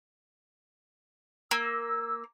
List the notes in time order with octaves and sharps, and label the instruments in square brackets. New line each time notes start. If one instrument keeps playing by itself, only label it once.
[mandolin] A#3 [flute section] E6